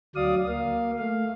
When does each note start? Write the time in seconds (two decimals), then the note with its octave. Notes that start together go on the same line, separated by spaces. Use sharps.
0.15 D2 F#3 D5 F5 D#6
0.48 A#3 F5
0.99 A3 F5